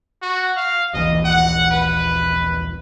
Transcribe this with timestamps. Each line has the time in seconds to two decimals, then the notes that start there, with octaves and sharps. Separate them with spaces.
0.22 F#4
0.57 F5
0.94 D#1 A#1 E3 D#5
1.25 F#5
1.71 B4